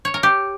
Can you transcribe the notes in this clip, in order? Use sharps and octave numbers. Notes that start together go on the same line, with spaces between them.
C#5
A#4
G4